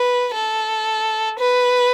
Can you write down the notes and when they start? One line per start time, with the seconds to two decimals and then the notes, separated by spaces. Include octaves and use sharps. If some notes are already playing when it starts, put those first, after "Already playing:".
Already playing: B4
0.35 A4
1.40 B4